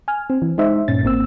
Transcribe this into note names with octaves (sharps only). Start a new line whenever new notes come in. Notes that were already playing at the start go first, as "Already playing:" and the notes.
G#5 F6
C4
E3
G#3 D#4 C5 E5
G2 A#2 C#4 A6
G#1 A#3 C4 E6